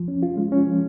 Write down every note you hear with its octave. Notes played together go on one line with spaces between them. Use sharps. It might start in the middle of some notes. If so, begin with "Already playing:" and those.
Already playing: F3
C#4
F4
G#3
C#4
F3